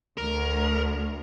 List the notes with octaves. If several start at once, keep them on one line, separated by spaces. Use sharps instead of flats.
D2 A#4